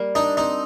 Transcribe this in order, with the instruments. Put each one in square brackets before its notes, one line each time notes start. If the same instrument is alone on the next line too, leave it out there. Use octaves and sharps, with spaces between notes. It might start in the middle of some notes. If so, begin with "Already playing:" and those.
Already playing: [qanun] G3 A#3
[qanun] D4 [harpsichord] D#4
[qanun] C4 [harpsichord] D#4